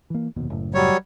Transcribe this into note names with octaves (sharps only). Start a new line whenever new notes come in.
E3 A#3
F1 D#2 B2
F#1 A2
F#3 G3 C#5